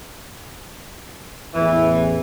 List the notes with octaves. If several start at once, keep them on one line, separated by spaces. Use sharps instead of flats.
A1 E2 E3